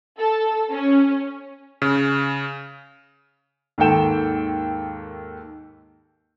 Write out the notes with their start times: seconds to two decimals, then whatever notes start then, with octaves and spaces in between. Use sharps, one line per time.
0.17 A4
0.70 C#4
1.82 C#3
3.78 D#2 G#2 D#3 A4 G5 E7